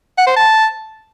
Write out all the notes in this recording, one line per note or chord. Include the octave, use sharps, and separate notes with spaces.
F#5
C5
A5